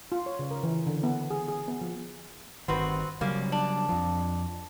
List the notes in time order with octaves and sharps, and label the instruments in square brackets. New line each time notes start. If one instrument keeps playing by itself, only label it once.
[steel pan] F4
C#5
C#3
A#4
E3
D3
B3
G#4
G#4
B3
F3
[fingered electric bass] G1 D#3 [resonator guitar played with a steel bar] C4 F#4 B4
[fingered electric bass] C#3 F#3 G3 [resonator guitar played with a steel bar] A#3 C#4
[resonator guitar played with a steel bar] D4
[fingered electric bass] F2 F3